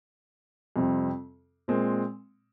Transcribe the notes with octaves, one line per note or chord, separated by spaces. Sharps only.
F2 C3 G3 C4
A#2 G#3 C4